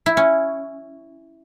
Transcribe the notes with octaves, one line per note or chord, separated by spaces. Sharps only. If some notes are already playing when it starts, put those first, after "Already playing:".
E4
C#4